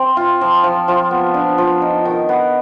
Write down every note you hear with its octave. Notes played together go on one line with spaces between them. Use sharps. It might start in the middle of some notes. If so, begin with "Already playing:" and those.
Already playing: C4
F4
F3
F3
F3
B3
D4
F3
D#4
D#3
B3